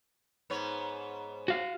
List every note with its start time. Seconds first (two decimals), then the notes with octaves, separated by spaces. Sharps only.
0.50 G#2 B3 C#5
1.48 F#4 F5